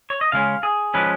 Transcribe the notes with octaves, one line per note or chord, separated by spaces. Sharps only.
C#5
D#5
C#3 G#3 C#4 F5
G#4
F3 G#3 C#4 B4